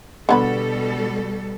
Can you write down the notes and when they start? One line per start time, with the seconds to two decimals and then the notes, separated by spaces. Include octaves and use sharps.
0.29 B2 D3 G3 B3 A4 B5